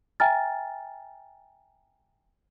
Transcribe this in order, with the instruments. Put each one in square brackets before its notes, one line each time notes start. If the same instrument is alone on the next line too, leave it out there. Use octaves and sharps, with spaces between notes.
[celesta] E5 G5 G#5 A#5 F6 A6